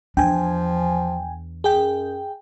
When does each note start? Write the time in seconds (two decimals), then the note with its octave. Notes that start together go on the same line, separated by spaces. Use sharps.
0.17 E2 F3 D4 G5 G#5
1.64 F#2 G#4 G5